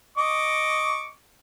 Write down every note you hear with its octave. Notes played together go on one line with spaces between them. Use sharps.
D#5 C#6 D6